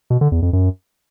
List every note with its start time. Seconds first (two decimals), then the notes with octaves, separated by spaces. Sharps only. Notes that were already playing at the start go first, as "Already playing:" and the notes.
0.10 B2
0.21 D3
0.32 E2
0.42 F2
0.53 F#2